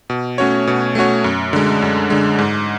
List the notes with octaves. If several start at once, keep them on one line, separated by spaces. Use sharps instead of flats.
B2
A3 C#4 F#4 C#5
B2
A3 C#4 F#4 C#5
F#2
D3 G#3
F#2
D3 G#3
G#2